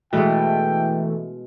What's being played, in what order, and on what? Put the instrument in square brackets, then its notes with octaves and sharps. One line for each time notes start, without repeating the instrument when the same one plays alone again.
[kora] B2 G#3 [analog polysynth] E3 A3 [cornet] G5